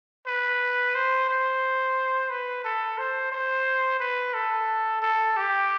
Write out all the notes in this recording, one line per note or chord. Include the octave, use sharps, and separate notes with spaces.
B4
C5
C5
B4
A4
C5
C5
B4
A4
A4
G4